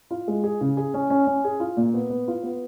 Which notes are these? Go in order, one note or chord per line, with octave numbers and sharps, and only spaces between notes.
F4
G#3
G#4
C#3
G#4
C#4
C#4
C#4
G#4
F4
A#2
B3
B3
F4
B3